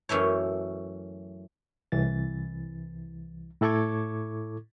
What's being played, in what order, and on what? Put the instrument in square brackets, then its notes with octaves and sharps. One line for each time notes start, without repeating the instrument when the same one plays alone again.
[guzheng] F#2 E3 A3 C#5
[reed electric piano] C2 E3 A6
A2 E4 A4 C#6 D6 G#6